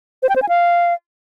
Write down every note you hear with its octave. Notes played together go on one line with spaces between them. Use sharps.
C5
G5
C5
G#5
F5